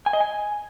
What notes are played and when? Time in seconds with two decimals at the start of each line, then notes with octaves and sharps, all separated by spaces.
0.06 G#5
0.13 D#5
0.20 G#5